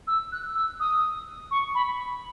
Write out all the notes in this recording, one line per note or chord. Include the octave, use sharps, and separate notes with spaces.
E6
F#6
E6
D#6
C#6
B5